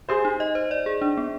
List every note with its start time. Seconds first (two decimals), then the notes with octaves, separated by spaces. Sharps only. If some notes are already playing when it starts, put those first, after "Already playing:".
0.09 G4 G#4 C5
0.25 D#4
0.40 D#5
0.55 C5
0.71 D5
0.86 G#4
1.02 D4
1.17 B3